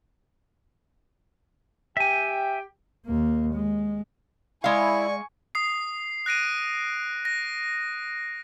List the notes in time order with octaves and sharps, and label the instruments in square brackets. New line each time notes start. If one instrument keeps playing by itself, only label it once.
[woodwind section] G4 G5 [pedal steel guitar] E5 G#5
[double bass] D#2 A#3
G#3
[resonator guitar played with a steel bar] G#3 F5 [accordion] E4 [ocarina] D5 [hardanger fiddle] G#5 C#6
[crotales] D#6 C7
F#6 A#6 D7 D#7
A#6